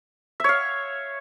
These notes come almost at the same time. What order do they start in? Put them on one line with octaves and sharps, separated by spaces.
E5 C#5 F5